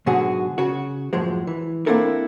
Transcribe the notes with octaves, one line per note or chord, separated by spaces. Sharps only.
G#2 B2 D3 F#3 F#4 G#4
C#3 F#4
F#2 A2 F3 G#3
E3
A#3 C4 D4 E4 A4 A#4